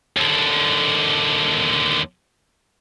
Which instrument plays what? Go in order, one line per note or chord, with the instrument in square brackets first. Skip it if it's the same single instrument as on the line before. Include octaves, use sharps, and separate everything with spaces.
[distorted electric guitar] D#2 D3